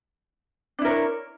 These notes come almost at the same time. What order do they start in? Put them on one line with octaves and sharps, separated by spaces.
D4 E4 A#4 C#5